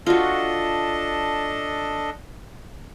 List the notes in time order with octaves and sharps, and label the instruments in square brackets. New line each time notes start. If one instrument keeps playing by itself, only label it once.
[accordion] D4 A4 D#5 [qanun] F4 F#4